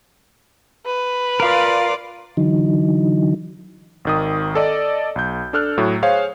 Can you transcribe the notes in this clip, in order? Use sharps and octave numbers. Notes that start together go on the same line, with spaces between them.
B4
F4 A#4 D5 F5
D3 E3 F#3 D#4
G#1 D#3 D#6
A4 D5 D#5
B1 G6
D4 A4 F6 F#6
A2 F#3 A3
G#4 C5 C#5 F5